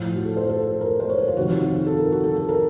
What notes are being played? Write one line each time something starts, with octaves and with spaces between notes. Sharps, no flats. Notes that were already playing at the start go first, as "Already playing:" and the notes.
Already playing: A2 F3
F#4
A4
C5
A4
A4
A#4
C5
C#5
C5
F4
F2 C3 D#3 F#4
F#4
F4
A4
A#4
F#4
A4
A4
A#4